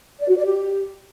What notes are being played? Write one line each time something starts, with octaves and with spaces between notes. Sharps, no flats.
D5
F#4
D5
G4